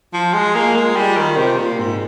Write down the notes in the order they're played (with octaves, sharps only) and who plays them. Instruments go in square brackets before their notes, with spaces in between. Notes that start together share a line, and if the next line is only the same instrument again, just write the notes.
[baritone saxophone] F3 [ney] F4
[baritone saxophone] G#3
A#3
G#3
G3
D#3
C3
A#2
G#2